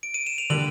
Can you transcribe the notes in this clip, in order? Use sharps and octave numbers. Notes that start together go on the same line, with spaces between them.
D7
D#7
E7
F7
D3 G3 A#3 F#7